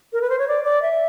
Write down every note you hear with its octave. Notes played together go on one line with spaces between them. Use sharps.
A#4
B4
C5
C#5
D5
D5
E5